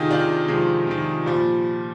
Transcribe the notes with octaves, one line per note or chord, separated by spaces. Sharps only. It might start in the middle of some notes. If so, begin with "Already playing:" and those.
Already playing: C3 D#3 D#4 F4 G4 G#4
C3 D#3 D4 F4
C3 D#3 F3 G#3
C3 D#3
A#2 F3 G3